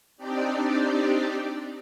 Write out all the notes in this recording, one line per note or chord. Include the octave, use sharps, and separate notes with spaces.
C4 D4 D#4 G4 D5